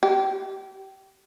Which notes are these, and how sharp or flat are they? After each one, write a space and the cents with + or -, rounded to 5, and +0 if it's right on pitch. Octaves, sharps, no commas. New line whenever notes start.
G4 -30